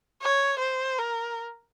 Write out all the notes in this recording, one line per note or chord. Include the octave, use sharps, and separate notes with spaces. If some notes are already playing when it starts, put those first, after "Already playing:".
C#5
C5
A#4